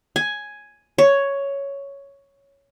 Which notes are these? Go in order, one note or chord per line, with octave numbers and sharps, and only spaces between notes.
G#5
C#5